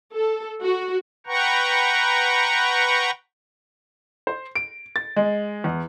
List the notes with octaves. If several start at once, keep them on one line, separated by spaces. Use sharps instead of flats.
A4
F#4
B4 F#5 G5 A#5 C#6
C5
D7
A6
G#3
E2